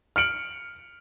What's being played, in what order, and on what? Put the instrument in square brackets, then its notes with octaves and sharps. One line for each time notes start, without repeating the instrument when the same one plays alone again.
[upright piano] F6 C#7 D7 F#7